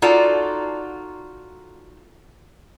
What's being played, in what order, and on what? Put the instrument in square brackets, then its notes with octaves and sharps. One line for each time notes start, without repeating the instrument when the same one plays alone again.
[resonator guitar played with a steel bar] D#4 F4 F#4 A4 D5